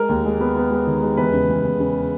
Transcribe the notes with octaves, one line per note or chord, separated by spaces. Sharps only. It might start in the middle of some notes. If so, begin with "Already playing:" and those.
Already playing: G#3 A#4
D#2
G#3
B3
B3
G#3
D#3
G#3
E2 B4
C#3
E2
E2
C#3